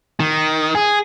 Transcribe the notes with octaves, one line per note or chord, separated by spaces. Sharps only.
D#3
G#4